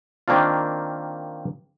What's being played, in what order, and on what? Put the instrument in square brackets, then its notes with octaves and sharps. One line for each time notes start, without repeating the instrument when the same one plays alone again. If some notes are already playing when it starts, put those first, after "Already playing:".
[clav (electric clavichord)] D#3 A#3 C4 D4 F4